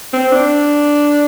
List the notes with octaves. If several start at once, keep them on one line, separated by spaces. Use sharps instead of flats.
C4
D4